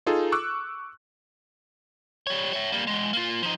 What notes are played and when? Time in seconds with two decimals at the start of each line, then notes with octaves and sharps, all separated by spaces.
0.06 D#4 F4 G#4 A4
0.32 C#6 D6 E6 F#6
2.27 G3 C#5
2.53 C#5 E5
2.72 G3 A#3
2.87 E2 G#3
3.13 A#3 F4
3.42 F3 D#4